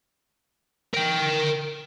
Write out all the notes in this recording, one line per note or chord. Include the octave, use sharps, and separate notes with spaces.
A#4 G5